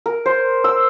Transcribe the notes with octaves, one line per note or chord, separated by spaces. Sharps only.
A#4
C5
E6